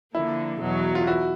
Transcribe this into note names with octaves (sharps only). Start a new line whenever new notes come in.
D3 F3 A#3 E4
E2 B2 F#3
F4
E4 F#4